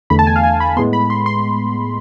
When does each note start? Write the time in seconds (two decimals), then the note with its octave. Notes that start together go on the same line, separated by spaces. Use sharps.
0.10 E2 D3 A3 B5
0.19 A5
0.27 G#5
0.36 F5
0.43 G#5
0.60 B5
0.77 A2 G#3 B3 C6
0.93 B5
1.10 C6
1.26 C6